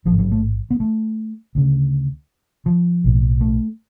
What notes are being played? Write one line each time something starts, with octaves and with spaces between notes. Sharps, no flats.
A1 F3
G#2
F#3
A3
B3
A3
D2 C#3
F3
B1 A2
A3